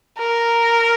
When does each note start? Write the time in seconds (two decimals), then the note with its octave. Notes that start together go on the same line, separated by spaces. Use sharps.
0.19 A#4